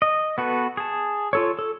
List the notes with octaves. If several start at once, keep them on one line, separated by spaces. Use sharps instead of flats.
D#5
B3 F#4 A4 B4
G#4 A5
F4 A4 C#5
A4